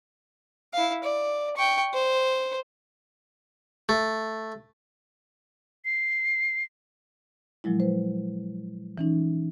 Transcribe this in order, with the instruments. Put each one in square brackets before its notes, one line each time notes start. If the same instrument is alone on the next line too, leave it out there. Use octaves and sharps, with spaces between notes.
[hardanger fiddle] E4 F5
D5
G5 C#6
C5
[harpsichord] A3
[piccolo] C7
[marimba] A#2 F3 F#3 G#3 E4
B4 C5
E3 C#4 D#4